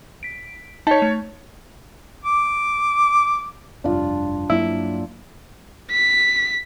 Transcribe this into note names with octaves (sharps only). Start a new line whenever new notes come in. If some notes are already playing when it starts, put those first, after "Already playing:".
B6 D7
D#4 C#5 D#5 A5 B6
A3
D6
F1 G2 D4 F4
G2 F#3 A#3 E4
B6